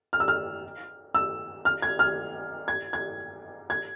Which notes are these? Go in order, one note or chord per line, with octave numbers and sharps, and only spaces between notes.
F6
E6
F6
E6
F6
G#6
F6
G#6
G#6
G#6